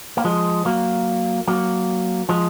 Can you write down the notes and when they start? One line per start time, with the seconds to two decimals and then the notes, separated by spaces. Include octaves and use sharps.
0.17 A#3
0.24 F3 G#3
0.65 F#3 A#3
1.47 F#3 A#3
2.29 F3 G#3